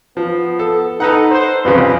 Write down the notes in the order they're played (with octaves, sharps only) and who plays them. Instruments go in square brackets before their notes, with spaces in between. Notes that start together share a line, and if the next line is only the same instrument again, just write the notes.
[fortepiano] F3 [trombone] B3
[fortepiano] A4
[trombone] D#4 [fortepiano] A4 B4 F#5
[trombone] C5
[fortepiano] C2 F2 C#3 [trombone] B4